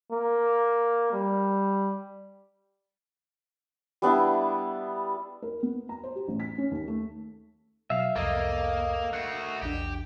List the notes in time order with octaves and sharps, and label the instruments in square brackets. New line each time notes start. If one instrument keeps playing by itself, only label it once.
[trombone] A#3
G3
[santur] G3 B3 D4 E4
[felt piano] A#4
B3
A#5
C5
G4
A1
B6
C#4
D#2
A3
[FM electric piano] B2 F#3 [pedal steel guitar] E5 F5
[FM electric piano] C2 F2 [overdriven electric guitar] A#3 [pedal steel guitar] A4 A#4 D#5
[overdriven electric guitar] A3 F#4 [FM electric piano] F#6 C7
[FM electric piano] A#1 E2 D4 [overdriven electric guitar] G4